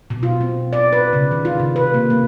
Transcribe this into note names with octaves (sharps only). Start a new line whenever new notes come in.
B2
F4
C4
D5
B4
C#3
D#3
F4
C3
B4
A#3
A#3